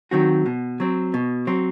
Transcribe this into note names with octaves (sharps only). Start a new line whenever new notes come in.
D#3 F#3 C4 F#4
B2
F#3 C4
B2
F#3 C4